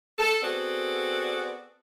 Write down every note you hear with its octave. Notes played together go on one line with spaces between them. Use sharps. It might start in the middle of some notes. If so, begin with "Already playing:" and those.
A4
B3 C4 F#4 G#4 A4 D5